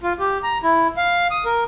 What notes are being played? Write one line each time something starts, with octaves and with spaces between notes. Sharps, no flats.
F4
G4
A#5
E4
F5
D#6
A#4